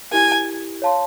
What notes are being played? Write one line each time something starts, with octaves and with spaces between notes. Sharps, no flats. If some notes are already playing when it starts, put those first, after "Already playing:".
E4 G4 A#4 G#5
C#5 F5 A5 C6